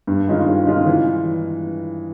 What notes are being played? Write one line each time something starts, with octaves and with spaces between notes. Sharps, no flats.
G2
D#3 G#3 C#4 F4
G2
D#3 G#3 C#4 F4
E3